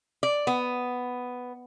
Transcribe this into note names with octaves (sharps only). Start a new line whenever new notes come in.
D5
B3